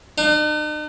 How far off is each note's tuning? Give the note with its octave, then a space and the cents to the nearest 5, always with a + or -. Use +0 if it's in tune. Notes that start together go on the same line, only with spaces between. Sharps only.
D#4 -45